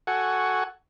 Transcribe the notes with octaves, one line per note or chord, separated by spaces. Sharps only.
F#4 A4 F#5 G#5 C#6